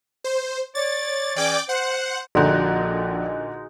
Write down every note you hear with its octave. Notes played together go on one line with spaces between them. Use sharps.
C5
C#5 D5 A6
E3 C#4 G#4 D5 G5 D6
C5 F#5
A#1 A#2 D3 G#3 D#4 F#4